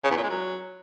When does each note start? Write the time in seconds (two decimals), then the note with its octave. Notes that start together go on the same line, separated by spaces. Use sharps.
0.04 C#3
0.11 E2
0.17 A#2
0.23 G#3
0.30 F#3